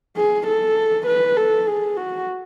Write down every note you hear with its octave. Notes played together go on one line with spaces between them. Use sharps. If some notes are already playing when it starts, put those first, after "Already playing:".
G#4
A4
B4
A4
G#4
F#4